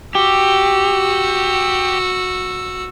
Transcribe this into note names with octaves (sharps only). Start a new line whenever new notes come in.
F#4 G4 E6